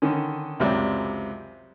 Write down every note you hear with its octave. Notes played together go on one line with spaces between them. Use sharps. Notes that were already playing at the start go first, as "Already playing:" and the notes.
D3 D#3 C#4
C#2 F#2 C3 D5